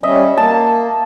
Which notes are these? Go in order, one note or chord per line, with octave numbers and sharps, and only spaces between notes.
G3 C#4 D#5 E5
A#3 A5